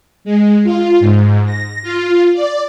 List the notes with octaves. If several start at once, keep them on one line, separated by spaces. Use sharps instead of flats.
G#3
F4
G#2
A#6
F4
D5